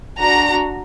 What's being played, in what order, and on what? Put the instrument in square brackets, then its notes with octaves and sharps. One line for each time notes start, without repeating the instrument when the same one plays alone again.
[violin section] D4 F#4 A#5